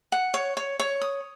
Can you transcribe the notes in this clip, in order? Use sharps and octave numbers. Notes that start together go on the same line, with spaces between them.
F#5
C#5
C#5
C#5
D#6